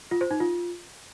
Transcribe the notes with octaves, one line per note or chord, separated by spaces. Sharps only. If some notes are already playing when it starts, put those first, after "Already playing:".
F4
C5
D#4
F4